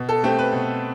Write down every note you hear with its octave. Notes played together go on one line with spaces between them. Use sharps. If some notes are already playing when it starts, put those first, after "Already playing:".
Already playing: B2
A4
A3 C4 G4
B4
B2